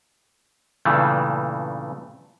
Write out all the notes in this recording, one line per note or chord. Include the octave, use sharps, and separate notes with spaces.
G2 A#2 C#3 E3 A3